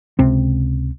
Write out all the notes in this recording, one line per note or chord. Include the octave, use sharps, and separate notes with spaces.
C#2 C3 C4